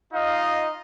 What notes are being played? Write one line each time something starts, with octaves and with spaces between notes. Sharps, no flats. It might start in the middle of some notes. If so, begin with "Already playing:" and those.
D#4 F4 D#5 F5